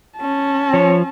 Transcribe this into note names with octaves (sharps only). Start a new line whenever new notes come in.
C#4 A5
F3 C#5